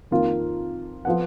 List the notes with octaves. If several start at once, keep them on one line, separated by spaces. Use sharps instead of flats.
F2 D#3 A#3 F4
F3 B3 F4 F#5